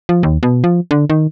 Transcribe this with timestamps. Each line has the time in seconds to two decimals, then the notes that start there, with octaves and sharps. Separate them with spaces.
0.09 F3
0.23 D#2
0.43 B2
0.64 F3
0.91 D3
1.10 D#3